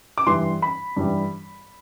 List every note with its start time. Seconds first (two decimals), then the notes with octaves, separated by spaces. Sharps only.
0.18 D6
0.26 G2 E3 G3 C6
0.62 B5
0.97 G2 E3 G3